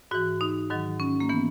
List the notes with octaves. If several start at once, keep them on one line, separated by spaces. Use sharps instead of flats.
G#2 E3 F#4
D#4
G#2 D#3 F#3
C#4
A#3
E3 B3